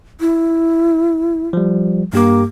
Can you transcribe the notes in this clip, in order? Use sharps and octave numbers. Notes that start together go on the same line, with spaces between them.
E4
F3 G3
G2 A#3 G4 D6